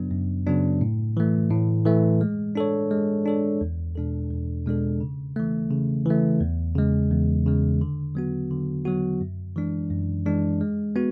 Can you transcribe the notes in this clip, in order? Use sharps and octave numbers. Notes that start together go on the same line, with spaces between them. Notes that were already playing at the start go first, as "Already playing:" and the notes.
Already playing: F#2 C#3 F#3 B3 D4
F#2
C#3 F#3 B3 D4
A2
E3 A3
A2
E3 A3
G#3
D4 A4 C#5
G#3
D4 A4 C#5
E2
B2 G#3 D4 A4
E2
B2 G#3 D4 A4
C#3
E3 A3
C#3
E3 A3
E2
C#3 G#3
E2
C#3 G#3
D3
F#3 B3 F#4
D3
F#3 B3 F#4
F#2
E3 G#3 D4
F#2
E3 G#3 D4
G#3
B3 F#4